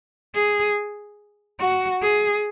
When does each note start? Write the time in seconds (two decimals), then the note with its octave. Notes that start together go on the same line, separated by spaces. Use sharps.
0.35 G#4
1.60 F#4
2.02 G#4